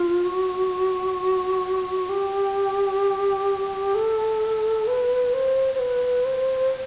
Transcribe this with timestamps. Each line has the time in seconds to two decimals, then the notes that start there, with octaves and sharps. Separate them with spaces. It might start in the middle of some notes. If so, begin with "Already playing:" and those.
Already playing: F4
0.25 F#4
2.09 G4
3.95 A4
4.87 B4
5.33 C5
5.74 C5
5.79 B4
6.25 C5